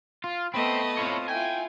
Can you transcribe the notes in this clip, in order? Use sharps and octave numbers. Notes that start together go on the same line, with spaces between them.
F4
A3 B3 C4 D#5 B5
C4 E4 F4 C#5
E4 F4 G5 G#5